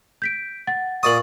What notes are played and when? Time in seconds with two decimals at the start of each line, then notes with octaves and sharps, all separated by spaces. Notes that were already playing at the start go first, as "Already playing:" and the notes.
0.22 G6 B6 D7
0.67 F#5 A6
1.03 A#2 D5 C#6 D#6 F#7